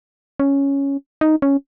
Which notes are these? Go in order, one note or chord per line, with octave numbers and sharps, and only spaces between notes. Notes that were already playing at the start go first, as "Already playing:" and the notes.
C#4
D#4
C#4